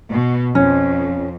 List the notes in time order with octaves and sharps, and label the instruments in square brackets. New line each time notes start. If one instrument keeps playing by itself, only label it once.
[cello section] B2
[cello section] F2 [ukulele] C#4